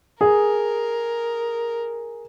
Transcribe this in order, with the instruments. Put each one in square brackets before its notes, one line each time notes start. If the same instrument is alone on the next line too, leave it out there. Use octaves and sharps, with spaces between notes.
[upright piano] G#4 [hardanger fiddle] A#4